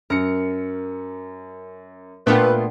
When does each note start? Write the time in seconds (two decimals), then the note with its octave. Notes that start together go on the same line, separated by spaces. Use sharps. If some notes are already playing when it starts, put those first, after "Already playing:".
0.10 F#2 A#4 C#7
2.27 A#2 A3 B3 D4 F4 B4 G5